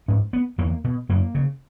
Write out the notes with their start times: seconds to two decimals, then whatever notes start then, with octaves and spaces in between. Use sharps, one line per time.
0.08 G#2 C#4
0.33 B3
0.58 E2 A#3
0.84 B2
1.09 F#2 A#3
1.35 C#3